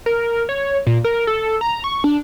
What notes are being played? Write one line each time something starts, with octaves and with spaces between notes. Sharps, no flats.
A#4
C#5
A#2
A#4
A4
A#5
C#6
D4